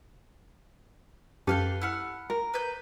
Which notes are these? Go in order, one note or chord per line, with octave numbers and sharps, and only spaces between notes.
F#2 G4 A4 B4 F5 G5
E4 F#5 F6
A#4
B4 G6